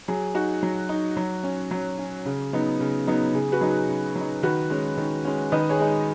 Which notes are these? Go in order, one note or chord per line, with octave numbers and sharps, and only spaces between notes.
F#3 G#4
D#4 F#4
F#3
D#4
F#3
C#4
F#3
C#4
C#3
F#3 B3 D#4
C#3
F#3 B3 D#4
C#3 G#4
F#4 B4
F#3 D#4
G#4
C#3
F#3
D#4
D#3 F#4 B4
G#3 C#4
D#3
G#3 C#4
D#3 B4 D#5
G#4 C#5
G#3 D#4
G#4